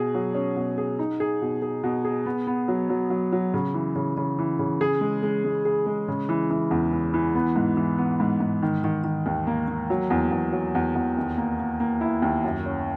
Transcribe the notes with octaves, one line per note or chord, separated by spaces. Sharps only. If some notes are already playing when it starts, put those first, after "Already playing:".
Already playing: B2 G#4
F#3
C#4
B2
G#4
D#4
G#4
B2
G#4
B2
G#4
B3
B3
F#3
F#3
F#3
F#3
C#3
E3
C#3
C#3
E3
C#3
G#4
G#3
G#3
G#3
G#4
G#3
C#3
E3
E3
E2
E3
E3
B3
G#2
E3
B3
G#2
G#2
D#3
D#3
D#3
D#2
A#3
A#3
F#3
E2
E2
F#3
E2
E2
D#2
A#3
A#3
A#3
E4
D#2
F#2
C#4